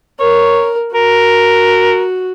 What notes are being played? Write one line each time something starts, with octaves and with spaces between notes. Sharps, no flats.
A#4 C#5
F#4 A#4